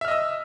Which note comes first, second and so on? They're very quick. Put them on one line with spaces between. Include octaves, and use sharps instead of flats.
E5 F6 D#5 E6